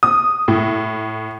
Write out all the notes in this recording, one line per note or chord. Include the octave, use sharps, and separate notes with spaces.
D#6
A2